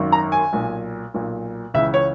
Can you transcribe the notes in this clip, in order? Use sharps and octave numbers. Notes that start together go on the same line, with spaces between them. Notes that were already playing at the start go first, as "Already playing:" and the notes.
Already playing: G#1 F#2 D#3
A#5
G#5
B1 A#2
B1 A#2
C#2 C#3 E3 E5
C#5